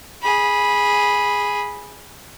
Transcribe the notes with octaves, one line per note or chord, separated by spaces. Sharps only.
G#4 B5